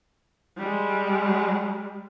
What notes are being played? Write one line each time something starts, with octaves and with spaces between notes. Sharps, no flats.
G3 G#3